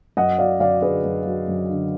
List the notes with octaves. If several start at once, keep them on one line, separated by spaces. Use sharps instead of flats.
F#2 D#5 F#5
F#3 D5 F5
F#2 D5 F5
D3 G#4 B4
F#2
F#3
F#2
D3